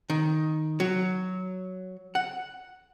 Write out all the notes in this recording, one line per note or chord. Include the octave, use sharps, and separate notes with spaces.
D#3
F#3
F#5